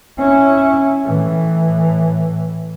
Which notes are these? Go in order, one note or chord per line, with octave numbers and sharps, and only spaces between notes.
C#4 E4
A2 E3